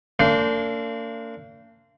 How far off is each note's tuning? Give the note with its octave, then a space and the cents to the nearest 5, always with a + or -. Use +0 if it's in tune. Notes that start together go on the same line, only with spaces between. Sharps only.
A#3 -40 D4 -30 C5 -20